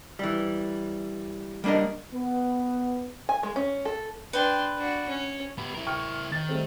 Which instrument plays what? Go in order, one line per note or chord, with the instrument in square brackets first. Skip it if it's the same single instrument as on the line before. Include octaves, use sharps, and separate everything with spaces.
[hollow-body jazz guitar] E3 G3
G3 A#3 D4 A#4 D#5
[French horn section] B3
[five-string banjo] G#5
G#3
C#4
A4
[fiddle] D4 C6 [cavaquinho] B4 G5
[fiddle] D4 F#4
C#4
[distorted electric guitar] B3 G4 [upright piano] B5
[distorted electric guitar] E4 A#4
[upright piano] G5 C#6 F6
[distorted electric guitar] D#3 [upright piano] A6
[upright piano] G3 A3 C4